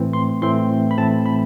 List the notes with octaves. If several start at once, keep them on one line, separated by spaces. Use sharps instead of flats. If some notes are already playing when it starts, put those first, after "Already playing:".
Already playing: A2 E3 A3 C4
C6
A2 E3 A3 C4 C6
B5
A2 E3 A3 C4 A5
B5